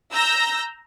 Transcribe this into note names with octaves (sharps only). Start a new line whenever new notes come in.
A#5 E6 G6 A#6